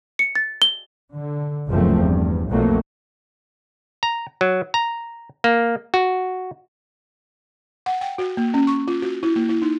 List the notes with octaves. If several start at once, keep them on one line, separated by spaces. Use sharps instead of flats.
C#7
A6
G7
D3
F#1 C#2 F#2 F3 A3 C4
E2 G2
B1 F2 F#3 A3 A#3
A#5
F#3
A#5
A#3
F#4
F#5
G5
F#4
A#3
C#4
C#6
F4
F#4
E4
A#3
E4
D#4